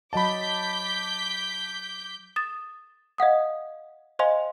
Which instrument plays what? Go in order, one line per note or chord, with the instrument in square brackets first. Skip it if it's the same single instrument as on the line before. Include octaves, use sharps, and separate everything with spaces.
[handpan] F#3 D#5 F#5 [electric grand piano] A5 B5 [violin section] D6 G6 B6
[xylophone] D#6 A6 E7
D#5 F5 F#5 D#6
C5 D#5 F5 G#5 C6